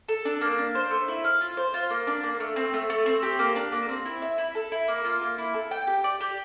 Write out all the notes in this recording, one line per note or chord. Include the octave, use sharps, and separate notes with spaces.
A4
D4
A#3
D4
C5
A3
E4
F5
F4
C5
F4
A#3
D4
A#3
A3
C4
A3
A3
C4
G4
A#3
D4
A#3
C4
E4
E5
E4
A4
E4
A#3
F4
A#3
E4
A4
G5
G4
D5
G4